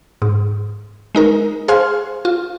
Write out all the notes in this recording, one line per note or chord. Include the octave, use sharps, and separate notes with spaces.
G#2
G#3 D#4 A#4
G#4 C5 F5 G#5 C6 F6
F4